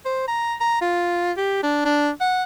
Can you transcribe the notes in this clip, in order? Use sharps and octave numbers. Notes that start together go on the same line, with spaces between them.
C5
A#5
A#5
F4
G4
D4
D4
F#5